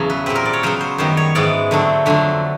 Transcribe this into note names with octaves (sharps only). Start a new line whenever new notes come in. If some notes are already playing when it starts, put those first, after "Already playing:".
Already playing: E2 C#3 F#3 A4
B4
A#2 G3 C4 B4
A#4
D5
C#5
C#3 F#3 B3 C5
C5
F#2 D#3 G3 B3 C5
C#5
G#2 E3 G#3 B3 D5
D3 F#3 A3 C4
F2 D3 F#3 A3